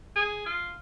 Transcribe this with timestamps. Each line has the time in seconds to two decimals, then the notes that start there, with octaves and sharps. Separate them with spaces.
0.16 G#4
0.46 F4